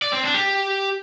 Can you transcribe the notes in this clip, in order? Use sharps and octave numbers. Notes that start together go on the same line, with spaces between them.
D5
C4
D4
G4